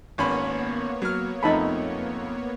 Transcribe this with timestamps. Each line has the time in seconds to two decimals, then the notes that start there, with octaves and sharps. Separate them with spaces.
0.18 G#1 A#3 B3 C#4 C#5 B5
1.02 F#3 F6
1.43 F2 A3 D#4 A5 B5